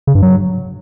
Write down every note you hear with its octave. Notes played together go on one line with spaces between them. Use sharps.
C#3
G2
F#3